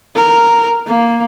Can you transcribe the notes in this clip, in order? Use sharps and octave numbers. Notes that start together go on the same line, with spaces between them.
A#4
A#3